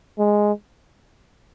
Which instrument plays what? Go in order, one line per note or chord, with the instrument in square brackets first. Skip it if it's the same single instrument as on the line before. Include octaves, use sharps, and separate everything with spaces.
[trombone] G#3